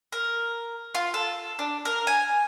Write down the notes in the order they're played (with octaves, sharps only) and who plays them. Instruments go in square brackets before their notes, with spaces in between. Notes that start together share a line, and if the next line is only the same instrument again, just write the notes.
[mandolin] A#4
F4
A4
D4
A#4
G#5